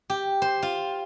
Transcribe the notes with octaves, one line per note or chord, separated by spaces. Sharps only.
G4
C5
F4